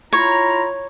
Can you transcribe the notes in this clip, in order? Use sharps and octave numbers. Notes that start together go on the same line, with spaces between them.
E4 F4 C#5 A#5